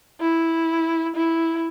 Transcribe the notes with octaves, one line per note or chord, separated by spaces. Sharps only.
E4
E4